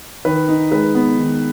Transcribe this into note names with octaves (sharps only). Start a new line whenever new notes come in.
D#3 B4
D#4
G#3 B4
B3
D#3